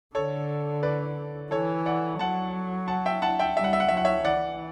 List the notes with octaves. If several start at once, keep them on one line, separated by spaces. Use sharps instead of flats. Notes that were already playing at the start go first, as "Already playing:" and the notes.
D3 A4 C#5
B4 D5
E3 A4 C#5
D5 F#5
F#3 F#5 A5
F#5 A5
E5 G5
F#5 A5
E5 G5
G3 E5
F#5
E5
F#5
F#3 E5
F#5
C#5 E5
E3 D5 F#5